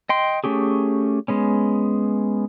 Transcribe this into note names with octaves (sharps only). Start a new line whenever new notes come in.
D#5 G5 C6
A3 C#4 G4 G#4
G#3 B3 C#4